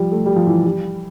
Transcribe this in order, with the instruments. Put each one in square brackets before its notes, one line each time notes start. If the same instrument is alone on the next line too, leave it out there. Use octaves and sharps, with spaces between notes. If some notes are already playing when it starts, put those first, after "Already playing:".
Already playing: [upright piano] F3 G3
A3
G3
F3
E3
G3